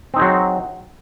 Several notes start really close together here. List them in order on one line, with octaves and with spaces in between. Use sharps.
C4 D#4 G#3 F#3